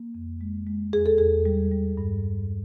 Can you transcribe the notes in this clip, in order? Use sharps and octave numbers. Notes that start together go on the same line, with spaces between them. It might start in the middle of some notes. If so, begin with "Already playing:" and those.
Already playing: A#3
F2
G#3
G#3
E2 G#4
A4
E2 G#4
G3
G3
G2
G2